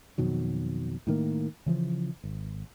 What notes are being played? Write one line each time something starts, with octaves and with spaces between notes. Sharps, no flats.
F2 B2 D#3 F#3
A2 D#3 A#3
C#3 E3 F3
G#1